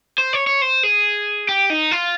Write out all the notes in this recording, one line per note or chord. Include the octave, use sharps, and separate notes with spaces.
C5
C#5
C#5
C5
G#4
G4
D#4
F4